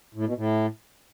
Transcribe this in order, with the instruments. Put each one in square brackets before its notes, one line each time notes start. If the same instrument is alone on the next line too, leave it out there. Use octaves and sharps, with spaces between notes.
[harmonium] A2
B2
A2